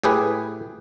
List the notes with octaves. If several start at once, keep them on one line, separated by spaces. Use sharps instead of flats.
A2 G4 G#4 B4